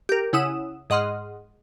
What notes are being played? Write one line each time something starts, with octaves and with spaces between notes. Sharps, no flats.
G4 A#4
C#3 E4 F#5 D#6 E7
G#2 D#5 F#5 C6 F6